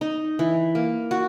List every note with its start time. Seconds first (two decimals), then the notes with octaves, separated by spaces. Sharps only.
0.01 D#4
0.39 E3
0.75 A#3
1.11 F#4